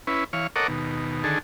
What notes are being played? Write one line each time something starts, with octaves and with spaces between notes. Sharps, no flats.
C#4 E4 B4
E3 C#5 F5
A4 A#4 C#5 D#5 F#5 D6
D#2 B2
D3 D#3 G#4 A4